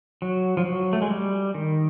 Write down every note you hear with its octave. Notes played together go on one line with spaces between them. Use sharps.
F#3
F3
F#3
A3
G#3
G3
D#3